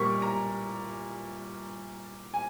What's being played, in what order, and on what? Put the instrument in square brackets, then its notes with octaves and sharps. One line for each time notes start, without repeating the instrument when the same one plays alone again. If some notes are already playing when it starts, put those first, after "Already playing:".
Already playing: [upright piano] A#2 G3 A#3 C#6
A#5
G#5